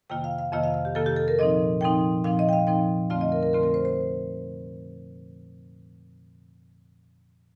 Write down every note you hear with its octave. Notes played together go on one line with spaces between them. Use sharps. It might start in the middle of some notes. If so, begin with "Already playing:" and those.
F2 C3 D#3 A#3 F4 G5
F5
F5
F2 C3 D#3 A#3 F4 D#5
F5
F5
G4
F2 C3 D#3 A#3 F4 A4
G4
A4
A#4
A#2 F3 C4 D#4 D#5
A#2 F3 C4 D#4 G5
A#2 F3 C4 D#4 F5
D#5
G5
F5
A#2 F3 C4 D#4 G5
F2 D3 A3 C4 F4 F5
D#5
A#4
A#4
F2 D3 A3 C4 F4 A#4
A#4
C5
C5